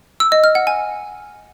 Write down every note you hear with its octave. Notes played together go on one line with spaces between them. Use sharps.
E6
D#5
F6
F#5
G#5